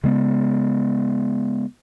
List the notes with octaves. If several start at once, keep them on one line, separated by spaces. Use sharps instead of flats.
C#3 G#3 B3